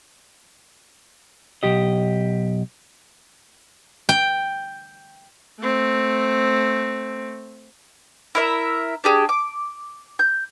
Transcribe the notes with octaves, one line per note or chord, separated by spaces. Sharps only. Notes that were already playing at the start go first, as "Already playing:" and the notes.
B1 G4 D#5
G5
A3 C4
E4 A#4 E5
D4 G4 G#4
D6
G6